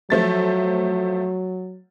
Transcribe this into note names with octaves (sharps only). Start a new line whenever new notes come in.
F3 F#3 A3 A6